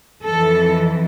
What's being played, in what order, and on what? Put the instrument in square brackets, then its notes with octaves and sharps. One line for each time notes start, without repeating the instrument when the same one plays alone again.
[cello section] F2 E3 A4